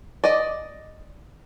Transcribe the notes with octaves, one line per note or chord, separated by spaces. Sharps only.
D5 D#5